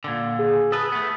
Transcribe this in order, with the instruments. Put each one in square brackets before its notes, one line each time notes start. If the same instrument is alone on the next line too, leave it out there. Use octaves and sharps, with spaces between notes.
[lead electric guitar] A#2 D3
[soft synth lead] G#4
[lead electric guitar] A4 B4 [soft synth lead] D#6
[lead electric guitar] A3 B3